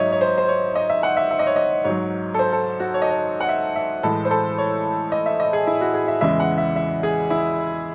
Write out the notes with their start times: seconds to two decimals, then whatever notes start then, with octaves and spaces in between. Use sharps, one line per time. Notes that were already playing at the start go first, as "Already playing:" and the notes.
Already playing: G#2 F#3 C#5 D#5 E5
0.12 C#5
0.21 C5
0.38 C5
0.48 C#5
0.75 D#5
0.89 E5
1.03 F#5
1.17 E5
1.30 E5
1.39 D#5
1.47 C#5
1.56 D#5
1.84 G#2 F#3 C#5
2.34 A4
2.39 C5
2.53 A4
2.80 F#4
2.94 C#5
3.02 D#5
3.10 C#5
3.40 F#5
3.49 E5
3.76 E5
4.03 A2 E3 G#3 A4
4.25 C5
4.31 A4
4.58 C#5
5.12 D#5
5.26 E5
5.40 D#5
5.53 G#4
5.67 E4
5.81 F#4
5.94 G#4
6.08 E5
6.21 E2 C#3 E3 G#3 E5
6.40 F#5
6.58 E5
6.76 E5
7.03 G#4
7.30 E4